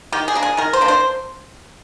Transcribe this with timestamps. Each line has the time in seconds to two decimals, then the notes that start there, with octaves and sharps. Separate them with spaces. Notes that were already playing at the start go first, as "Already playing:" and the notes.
0.12 D#3 G4
0.28 G#4
0.35 A#3 D4
0.43 G#4
0.57 D#3 A#4
0.73 C5
0.81 A#3 D4
0.88 C5